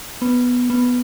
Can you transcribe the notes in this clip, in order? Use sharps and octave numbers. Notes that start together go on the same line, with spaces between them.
B3
B3